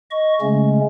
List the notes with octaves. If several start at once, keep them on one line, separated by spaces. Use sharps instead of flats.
D#5 C#6
C#3 G#3 A3 C#4